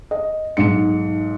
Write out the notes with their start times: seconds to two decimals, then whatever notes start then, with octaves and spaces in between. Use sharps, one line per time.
0.11 D#5
0.57 B1 G#2 C#7